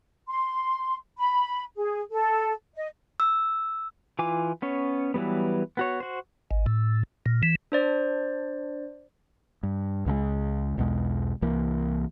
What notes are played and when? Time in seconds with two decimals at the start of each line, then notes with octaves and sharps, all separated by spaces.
0.28 C6
1.18 B5
1.76 G#4
2.11 A4
2.75 D#5
3.20 E6
4.19 E3 F4 G#5 D6
4.62 B3 C#4 C#5
5.14 E3 F#3 G3 B3
5.77 B3 F#4 C#5
6.00 F#4 C5
6.51 G#1
6.66 A2
7.26 A#2
7.43 E3
7.72 D4 C5 D5
9.63 G2
10.06 C#2 C#3 E3 G#3
10.77 B1 E2 B2 G#3
11.42 C2 E3 A#3